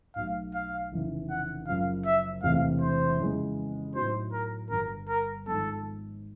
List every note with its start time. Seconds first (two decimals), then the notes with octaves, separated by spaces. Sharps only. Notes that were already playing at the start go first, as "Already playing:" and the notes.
0.16 B1 B2 F#3 A3 F5
0.55 F5
0.92 F1 F2 C#3 E3
1.30 F#5
1.68 F#1 F#2 C#3 F3 F5
2.06 E5
2.43 E1 E2 C3 E3 A3 F5
2.81 C5
3.19 F2 C#3 E3 G#3 B3
3.95 A2 F#3 B3 D#4 F#4 C5
4.33 A#4
4.70 G1 G2 D3 A#4
5.08 A#4
5.46 G#1 G#2 F3 G#3 B3 A4